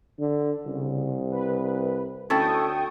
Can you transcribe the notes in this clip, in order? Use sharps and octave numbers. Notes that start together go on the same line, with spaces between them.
D3
C2 C#3
B4
D2 C#4 E4 A4 G5 C#6 D#6